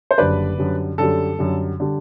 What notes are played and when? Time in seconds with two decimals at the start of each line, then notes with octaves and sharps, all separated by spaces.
0.11 C5
0.18 F#1 F#2 D3 G3 B4 D5
0.58 F#2 D3 G3
0.98 F#2 D3 G3 A4
1.39 F#2 D3 G3
1.80 D3 G3